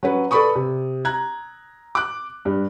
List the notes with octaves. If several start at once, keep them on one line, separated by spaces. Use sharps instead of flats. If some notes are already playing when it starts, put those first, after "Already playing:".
F#3 C#4 B4
A4 B4 D5 B5 C#6 D#6
C3
A#5 F#6 G#6
D6 F#6
G2